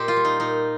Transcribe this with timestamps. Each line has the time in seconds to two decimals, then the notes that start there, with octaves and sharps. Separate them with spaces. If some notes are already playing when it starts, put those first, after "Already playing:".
Already playing: A#2 G4 A#4 C5 D#5
0.08 F4
0.16 G3
0.25 D#4
0.40 A#2 D#4